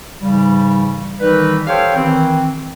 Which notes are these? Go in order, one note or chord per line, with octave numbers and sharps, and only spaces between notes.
G#2 C#3 E3 G3
D#3 E3 G3 D#4 B4
G4 A4 C5 C#5 F5 G5
D#3 E3 C4